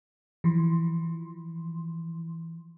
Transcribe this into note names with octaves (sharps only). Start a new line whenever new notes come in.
E3 F3 C6